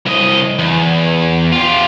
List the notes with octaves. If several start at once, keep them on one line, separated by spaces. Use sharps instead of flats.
C2 D#5
E2
F4 G4